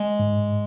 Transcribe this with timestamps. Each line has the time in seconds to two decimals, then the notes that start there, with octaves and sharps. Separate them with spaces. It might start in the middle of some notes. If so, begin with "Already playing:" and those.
Already playing: G#3
0.19 G#2